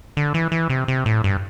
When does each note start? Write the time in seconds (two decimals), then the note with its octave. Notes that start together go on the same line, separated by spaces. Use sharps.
0.17 D3
0.34 E3
0.52 E3
0.70 C3
0.88 C3
1.06 A2
1.24 G2